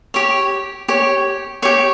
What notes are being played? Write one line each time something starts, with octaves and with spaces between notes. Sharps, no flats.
G4 C#5
G4 C#5
G4 C#5 C#6